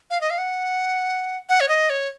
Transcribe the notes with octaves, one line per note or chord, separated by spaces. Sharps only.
F5
D#5
F5
F#5
F#5
C#5
D#5
C#5